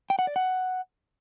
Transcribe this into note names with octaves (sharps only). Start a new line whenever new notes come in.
G5
F#5
D5
F#5